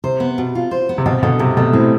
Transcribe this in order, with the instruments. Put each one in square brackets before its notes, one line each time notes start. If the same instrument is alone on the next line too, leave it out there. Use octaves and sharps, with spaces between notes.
[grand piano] C3 [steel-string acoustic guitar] C5
[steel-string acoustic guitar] B3
B2
F4
C5
B3
[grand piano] C3
[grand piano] B2 [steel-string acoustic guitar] C4
[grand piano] B2 [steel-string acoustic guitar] D3
[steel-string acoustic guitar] G2 [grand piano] C3
[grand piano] B2 [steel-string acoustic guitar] A3
[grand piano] A2 [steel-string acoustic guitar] C4